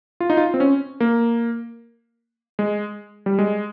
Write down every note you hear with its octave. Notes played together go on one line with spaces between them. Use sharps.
F4
D#4
F4
C4
C#4
A#3
G#3
G3
G#3